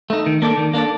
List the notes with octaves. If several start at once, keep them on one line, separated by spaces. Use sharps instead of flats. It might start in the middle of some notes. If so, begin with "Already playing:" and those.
A3 D#4
D#3
A#3 D4 A4 D5
D#3
A#3 D4 A4 D5